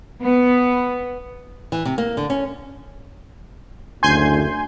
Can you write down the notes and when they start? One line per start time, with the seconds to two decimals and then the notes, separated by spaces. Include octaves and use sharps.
0.22 B3
1.72 E3
1.85 C3
1.98 A#3
2.17 D3
2.30 C#4
4.03 F#1 D2 G#5 C6 G6